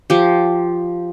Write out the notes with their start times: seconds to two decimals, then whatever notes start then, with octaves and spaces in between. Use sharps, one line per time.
0.10 F3 G4